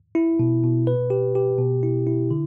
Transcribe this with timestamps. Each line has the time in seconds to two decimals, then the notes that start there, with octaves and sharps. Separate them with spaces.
0.15 E4
0.39 B2
0.64 B2
0.87 B4
1.10 G4
1.35 G4
1.58 B2
1.83 E4
2.07 E4
2.31 D3